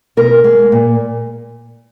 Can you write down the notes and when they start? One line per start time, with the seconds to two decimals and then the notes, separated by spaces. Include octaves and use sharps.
0.17 B2 A#4
0.44 G#3
0.72 A#2